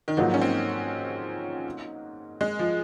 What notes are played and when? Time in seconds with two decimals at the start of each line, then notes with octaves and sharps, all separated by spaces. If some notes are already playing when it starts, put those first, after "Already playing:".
0.08 D#3
0.17 G#2 F3 F#3 A#3 D#4 F#4
0.34 C#4
0.41 C4
2.41 G#3
2.59 F3